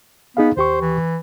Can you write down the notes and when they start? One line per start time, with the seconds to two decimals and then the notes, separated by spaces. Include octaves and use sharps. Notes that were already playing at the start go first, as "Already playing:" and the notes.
0.37 B3 D#4 G#4 F5
0.57 D#2 G4 C5 C#6
0.81 E3